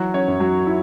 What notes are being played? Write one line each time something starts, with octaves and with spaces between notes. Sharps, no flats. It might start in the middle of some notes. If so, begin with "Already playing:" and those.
Already playing: E3 F#3 F#4
C#4 C#5
F#2
F#3 F#4
E4